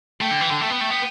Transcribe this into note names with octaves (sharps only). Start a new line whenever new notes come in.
A3 G5
D3
E3
D3
A3 G5
B3
A3
B3